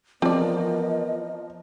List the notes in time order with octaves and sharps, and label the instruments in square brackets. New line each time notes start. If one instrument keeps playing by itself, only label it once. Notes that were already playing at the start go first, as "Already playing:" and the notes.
[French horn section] E3 B3 A#4 [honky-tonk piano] F3 [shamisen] C4 D5 [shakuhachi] D#5